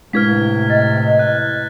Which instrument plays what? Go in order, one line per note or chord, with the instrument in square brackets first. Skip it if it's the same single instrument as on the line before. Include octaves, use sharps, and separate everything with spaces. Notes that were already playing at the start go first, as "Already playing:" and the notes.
[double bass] A2 C3 [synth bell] G#3 E4 B4 [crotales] F6 G#6 B6
[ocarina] D#5 [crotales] A6
[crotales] F#6